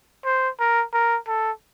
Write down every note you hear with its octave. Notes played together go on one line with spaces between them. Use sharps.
C5
A#4
A#4
A4